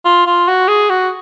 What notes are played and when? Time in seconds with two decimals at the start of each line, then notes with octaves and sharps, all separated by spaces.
0.05 F4
0.26 F4
0.48 F#4
0.68 G#4
0.90 F#4